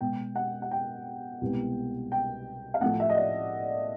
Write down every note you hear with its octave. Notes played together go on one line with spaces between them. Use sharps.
B2 G#3 B3 G5
F#5
F#5
G5
C2 B2 G#3 B3
G5
F5
A2 F3 A3 F#5
E5
D#5
D5